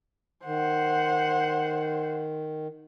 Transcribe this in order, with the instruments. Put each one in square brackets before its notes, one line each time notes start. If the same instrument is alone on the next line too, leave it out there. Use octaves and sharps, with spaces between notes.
[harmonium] D#3 [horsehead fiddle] C5 F#5